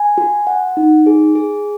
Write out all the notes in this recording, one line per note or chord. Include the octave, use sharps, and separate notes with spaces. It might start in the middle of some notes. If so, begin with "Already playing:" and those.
Already playing: G#5
F#4
F#5
D#4
G#4
G#4